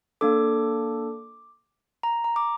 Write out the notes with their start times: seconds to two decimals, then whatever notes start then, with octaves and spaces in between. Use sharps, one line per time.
0.21 A#3 D4 A4 D6
2.03 A#5
2.24 A#5
2.36 D6